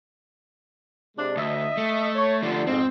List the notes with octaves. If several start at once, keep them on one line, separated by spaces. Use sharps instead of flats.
C3 G#3 D4
D2 D#5 E5
A3
C#5
D3 F3 A3
F2 G#2 C4